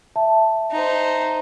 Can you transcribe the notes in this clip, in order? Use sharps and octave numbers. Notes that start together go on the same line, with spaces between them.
E5 A5
D#4 C5